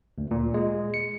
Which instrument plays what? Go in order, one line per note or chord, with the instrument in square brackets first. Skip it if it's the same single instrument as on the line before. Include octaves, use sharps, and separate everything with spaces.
[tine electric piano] D2
A#2
G#3
C#7